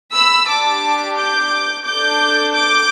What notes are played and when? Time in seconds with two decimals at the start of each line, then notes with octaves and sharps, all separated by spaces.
0.14 B5 E6
0.48 D4 G4 A5 D6
1.17 D6 G6
1.85 D4 A4 D6 G6
2.54 D6 G6